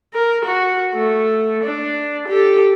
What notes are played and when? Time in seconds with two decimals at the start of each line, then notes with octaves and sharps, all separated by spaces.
0.13 A#4
0.45 F#4
0.94 A3
1.63 D4
2.28 G4 A4